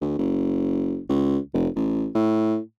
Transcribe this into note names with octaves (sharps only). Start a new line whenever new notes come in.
D2
F#1
C#2
F1
A1
A2